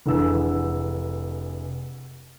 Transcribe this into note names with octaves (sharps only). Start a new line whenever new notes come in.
F1 D3 E3 G#4 E6